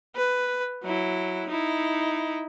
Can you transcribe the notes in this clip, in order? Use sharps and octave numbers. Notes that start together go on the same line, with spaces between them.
B4
F#3 E4
D#4 E4